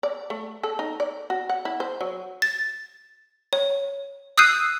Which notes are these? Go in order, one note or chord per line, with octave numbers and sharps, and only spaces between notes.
D5
A3
A4
D#4
D5
F#4
F#5
E4
C5
F#3
A6
C#5
D#6 E6 F#6 G6 C7 D#7